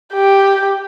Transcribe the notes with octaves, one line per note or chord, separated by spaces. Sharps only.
G4